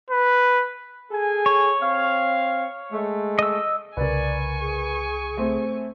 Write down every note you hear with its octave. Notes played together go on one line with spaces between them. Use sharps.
B4
G#4 A4 G#5
C#5
C4 F5
G#3 A3
D#5 E6
C2 C#3 A#4 B4 D5 G#5 C#6
G#4
A3 C4